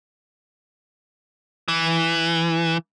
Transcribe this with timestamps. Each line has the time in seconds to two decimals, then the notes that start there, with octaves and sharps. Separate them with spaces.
1.68 E3